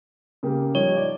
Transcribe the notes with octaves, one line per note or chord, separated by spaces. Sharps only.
C#3 A#3 G4
F3 G3 D#4 C#5
D5